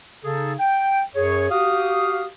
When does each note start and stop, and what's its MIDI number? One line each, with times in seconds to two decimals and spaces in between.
0.24 0.53 49
0.24 0.53 63
0.24 0.53 68
0.24 0.53 69
0.60 1.01 79
1.15 1.50 42
1.15 1.50 68
1.15 1.50 73
1.50 2.25 66
1.50 2.25 67
1.50 2.25 77
1.50 2.25 87